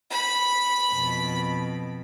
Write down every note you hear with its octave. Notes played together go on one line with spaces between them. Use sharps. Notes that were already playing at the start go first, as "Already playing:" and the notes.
B5
F2 B2